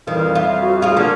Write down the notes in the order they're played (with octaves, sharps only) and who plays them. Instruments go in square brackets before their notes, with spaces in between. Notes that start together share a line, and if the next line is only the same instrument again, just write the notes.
[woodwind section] F2 G3 F5 [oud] D#3 [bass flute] E3
[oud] F4 [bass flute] E5
[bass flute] F#4
[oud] G#3 F4 [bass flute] G#4
[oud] D3 [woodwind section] A#3 C#4 [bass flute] D4